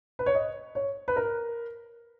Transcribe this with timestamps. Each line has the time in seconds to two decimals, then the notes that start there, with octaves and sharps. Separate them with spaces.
0.19 B4
0.26 C#5
0.35 D#5
0.75 C#5
1.08 B4
1.16 A#4